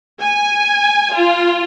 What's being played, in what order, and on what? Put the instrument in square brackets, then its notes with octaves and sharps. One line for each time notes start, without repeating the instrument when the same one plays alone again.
[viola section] G#5
F4